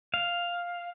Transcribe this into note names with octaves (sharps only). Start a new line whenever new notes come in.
F5